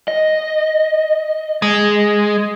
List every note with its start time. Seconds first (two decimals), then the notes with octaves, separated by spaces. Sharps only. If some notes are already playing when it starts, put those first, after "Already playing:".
0.08 D#5
1.62 G#3